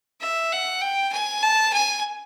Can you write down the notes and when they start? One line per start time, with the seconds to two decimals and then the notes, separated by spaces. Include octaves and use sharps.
0.21 E5
0.52 F#5
0.82 G5
1.13 G#5
1.43 A5
1.73 G#5